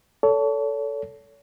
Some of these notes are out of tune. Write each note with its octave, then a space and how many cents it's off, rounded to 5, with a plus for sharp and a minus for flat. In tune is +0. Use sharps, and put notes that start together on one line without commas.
A4 +0 C#5 +35